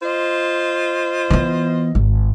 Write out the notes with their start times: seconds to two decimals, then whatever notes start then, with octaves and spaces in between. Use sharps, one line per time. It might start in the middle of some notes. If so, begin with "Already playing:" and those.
0.02 F4 C5 D#5
1.30 E3 B3
1.95 G#1